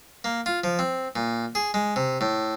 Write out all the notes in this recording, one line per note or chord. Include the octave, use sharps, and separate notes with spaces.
A#3
F4
F3
C4
A#2
G#4
G#3
C3
A2